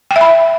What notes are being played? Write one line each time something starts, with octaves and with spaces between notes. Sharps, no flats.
G5
E5
B5